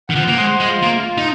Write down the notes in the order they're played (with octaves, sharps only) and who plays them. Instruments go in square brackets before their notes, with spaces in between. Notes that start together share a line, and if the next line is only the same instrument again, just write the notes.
[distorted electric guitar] D#3 [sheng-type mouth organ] F#5
[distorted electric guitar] F3
A#3
[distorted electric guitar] G#3 [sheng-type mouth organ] C5
[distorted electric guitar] G#3
[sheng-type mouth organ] F4
[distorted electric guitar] A#3
[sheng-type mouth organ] F4
[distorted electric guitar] D#4